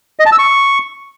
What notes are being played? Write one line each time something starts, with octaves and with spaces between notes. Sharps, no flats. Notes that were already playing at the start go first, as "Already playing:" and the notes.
D#5
A5
E6
C#6